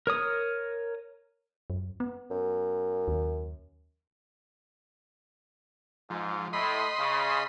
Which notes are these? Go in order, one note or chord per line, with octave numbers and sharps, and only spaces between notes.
A#4 C#5 D#6
F#2
B3
F#2
D#2
G#2 F3
A2 D#5 B5 C6
C#3